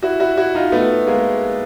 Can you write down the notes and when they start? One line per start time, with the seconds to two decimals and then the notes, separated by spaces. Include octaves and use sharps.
0.02 E4 F#4
0.20 E4 F#4
0.37 E4 F#4
0.55 D#4 F4
0.72 A3 B3
1.07 G#3 A#3